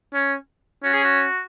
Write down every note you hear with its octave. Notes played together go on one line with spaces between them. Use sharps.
C#4
C#4 F#4
G#4
F#4